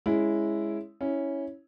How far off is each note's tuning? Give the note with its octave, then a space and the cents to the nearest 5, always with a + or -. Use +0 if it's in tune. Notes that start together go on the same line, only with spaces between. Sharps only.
G#3 +0 C#4 +0 E4 +0
C#4 +0 E4 -15